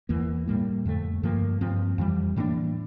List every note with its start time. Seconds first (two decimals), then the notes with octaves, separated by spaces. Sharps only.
0.09 E2 E3 A#3
0.48 A2 G3 A#3
0.85 F2 D3 A3
1.23 G2 F3 A#3
1.61 G2 F3 C4
1.98 F2 E3 G3
2.36 A2 E3 A#3 D4